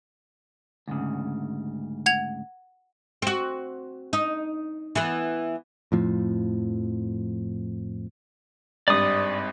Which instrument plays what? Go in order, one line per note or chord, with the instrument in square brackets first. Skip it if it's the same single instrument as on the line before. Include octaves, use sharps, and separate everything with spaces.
[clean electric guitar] D2 G#2 C#3
[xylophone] F#5 G#6 F7
[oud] C4 F#4
D#4
E3 B3
[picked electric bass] F2 A2 F3
[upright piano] G#1 G2 [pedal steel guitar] D5 D#6